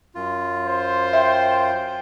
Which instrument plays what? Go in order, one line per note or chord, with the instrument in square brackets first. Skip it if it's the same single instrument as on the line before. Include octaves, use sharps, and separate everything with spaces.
[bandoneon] F#2 F4
[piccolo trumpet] C5
[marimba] E5 [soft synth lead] G5